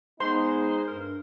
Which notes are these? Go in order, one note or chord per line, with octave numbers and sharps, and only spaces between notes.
G#3 B3 D#4 C5 C6
G2 A#4